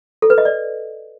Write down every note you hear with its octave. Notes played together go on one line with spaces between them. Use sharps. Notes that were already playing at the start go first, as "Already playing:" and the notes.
A4
B4
D#5
D5